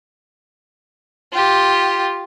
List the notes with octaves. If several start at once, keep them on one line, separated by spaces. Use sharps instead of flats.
F4 G4